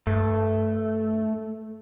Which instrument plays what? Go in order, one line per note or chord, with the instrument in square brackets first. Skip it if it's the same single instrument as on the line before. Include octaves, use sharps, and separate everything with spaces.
[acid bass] G2 [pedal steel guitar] A3